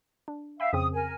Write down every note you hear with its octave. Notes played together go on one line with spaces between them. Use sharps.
D4
E5 F5 G5 B5
F2 C#3 C4 D#6
A#4 G#5